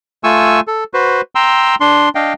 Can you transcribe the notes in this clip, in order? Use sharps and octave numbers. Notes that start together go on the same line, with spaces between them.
A3 F4 G#5 C#6 E6
A4
F#4 B4 C5
G5 A#5 C6 E6
D4 C6
D4 D#5 F5 G5